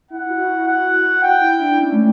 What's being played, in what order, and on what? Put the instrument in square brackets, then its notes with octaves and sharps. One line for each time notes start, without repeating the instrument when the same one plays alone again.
[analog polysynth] E4 [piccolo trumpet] F#5
[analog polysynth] E4
F#4
E4
[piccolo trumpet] F#5
[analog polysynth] F#4
F#4
[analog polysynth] E4 [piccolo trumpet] G5
[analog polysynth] E4
D4
C#4
A3